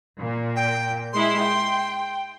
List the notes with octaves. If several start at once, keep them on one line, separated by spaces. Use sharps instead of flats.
A#2
G5
G#3 E4 C6
G5